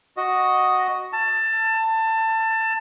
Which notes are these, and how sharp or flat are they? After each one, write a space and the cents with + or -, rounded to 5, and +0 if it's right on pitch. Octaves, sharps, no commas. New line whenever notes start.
F#4 +0 D#5 +0
A5 +20 E6 +40